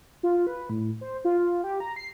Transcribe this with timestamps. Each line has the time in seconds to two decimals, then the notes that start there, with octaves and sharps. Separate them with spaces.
0.23 F4
0.47 B4
0.69 A2
1.01 C5
1.25 F4
1.64 G4
1.80 A#5
1.96 C7